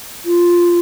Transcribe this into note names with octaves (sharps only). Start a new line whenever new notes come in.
F4